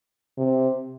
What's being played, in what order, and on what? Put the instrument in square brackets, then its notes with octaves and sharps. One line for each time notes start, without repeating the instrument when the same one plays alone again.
[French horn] C3